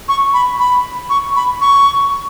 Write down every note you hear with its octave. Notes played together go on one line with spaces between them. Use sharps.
C#6
B5
B5
C#6
B5
C#6